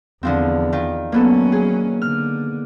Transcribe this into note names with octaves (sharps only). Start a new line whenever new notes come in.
E2 D3 F3 C4
D#3 F4
F#3 A#3 B3 C#4 A4
G#4
D3 F6